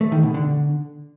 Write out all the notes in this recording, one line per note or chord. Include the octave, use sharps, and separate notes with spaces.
A3
D#3
B2
D3